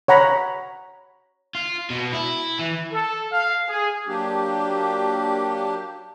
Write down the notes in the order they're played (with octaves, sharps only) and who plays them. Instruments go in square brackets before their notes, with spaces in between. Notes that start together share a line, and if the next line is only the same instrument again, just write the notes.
[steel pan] C#5 F#5 A#5 B5
[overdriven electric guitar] F4
B2
E4
E3
[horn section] A4
F5
G#4
[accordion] F#3 A#3 D4 G4